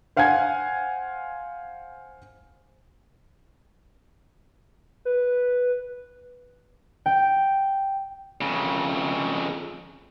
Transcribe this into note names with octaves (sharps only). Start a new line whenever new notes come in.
C5 F5 F#5 G#5 G#6
B4
G5
F2 C#3